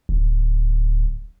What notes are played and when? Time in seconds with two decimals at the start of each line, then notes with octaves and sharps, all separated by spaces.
0.09 D1